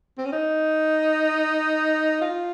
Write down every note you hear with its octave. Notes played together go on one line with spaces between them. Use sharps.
C4
C#4
D#4
F4